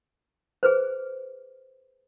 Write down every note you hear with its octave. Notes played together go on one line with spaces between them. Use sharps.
G#4 B4 C5